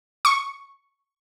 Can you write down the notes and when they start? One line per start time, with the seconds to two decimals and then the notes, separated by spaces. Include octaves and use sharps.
0.25 C#6